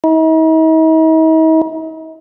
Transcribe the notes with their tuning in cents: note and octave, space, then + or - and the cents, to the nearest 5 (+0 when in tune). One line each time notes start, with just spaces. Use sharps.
D#4 +45